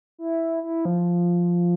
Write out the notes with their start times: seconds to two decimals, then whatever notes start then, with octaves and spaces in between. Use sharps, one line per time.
0.18 E4
0.63 E4
0.85 F3